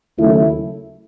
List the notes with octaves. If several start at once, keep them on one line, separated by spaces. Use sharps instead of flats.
D#2 C#3 F#3 A3 E4